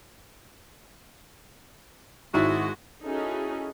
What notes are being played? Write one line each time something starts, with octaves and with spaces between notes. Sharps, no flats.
G#1 G#3 E4 F#4
C#4 D#4 E4 F#4 G#4 A4